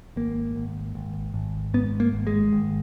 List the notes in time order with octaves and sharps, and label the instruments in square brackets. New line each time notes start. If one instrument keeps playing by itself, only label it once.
[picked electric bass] G#1 A#3
G#1
G#1
G#1
G#2 B3
A#3
G#1
G#3
G#1